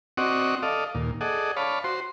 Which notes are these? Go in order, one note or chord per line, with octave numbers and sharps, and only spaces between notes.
C4 F#4 D5 D#5 F#5 C#6
A4 D5 D#5 F5
D#2 A#2
G#4 A4 D5 D#5 F#5
C#5 D5 F5 A5 B5
F#4 C5 C6